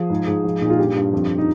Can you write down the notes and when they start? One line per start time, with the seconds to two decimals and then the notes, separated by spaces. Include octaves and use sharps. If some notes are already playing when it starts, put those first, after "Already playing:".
Already playing: F3 G#4
0.10 G#2
0.28 G#2
0.45 F3
0.61 A#2 D#4
0.70 F4
0.79 G2 G4
0.96 G2
1.13 F2
1.38 D#4